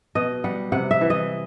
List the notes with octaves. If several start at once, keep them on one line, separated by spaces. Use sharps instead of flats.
B2 D#5
G3 F#5
C3 F#5
E5
E3
D#5